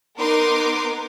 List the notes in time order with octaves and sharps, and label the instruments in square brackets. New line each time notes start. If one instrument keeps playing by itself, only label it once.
[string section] B3 A#4 [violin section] D#4 C6 D6